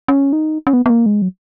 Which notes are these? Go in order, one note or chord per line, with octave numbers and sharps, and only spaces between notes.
C#4
D#4
C#4
B3
B3
A#3
G#3
F#3